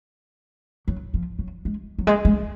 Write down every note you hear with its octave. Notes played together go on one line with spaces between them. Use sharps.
F#3
F3
F#3
G#3
F#3
G#3
G#3